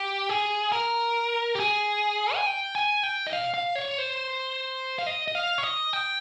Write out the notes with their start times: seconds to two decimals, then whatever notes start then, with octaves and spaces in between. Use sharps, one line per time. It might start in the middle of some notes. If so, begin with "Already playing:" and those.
Already playing: G4
0.29 G#4
0.72 A#4
1.55 G4
1.60 G#4
2.35 G#5
2.46 G5
2.75 G#5
3.03 G5
3.27 D#5
3.33 F5
3.54 F5
3.75 C#5
3.98 C5
4.99 F5
5.06 D#5
5.28 D#5
5.35 F5
5.58 C#5
5.63 D#5
5.93 G5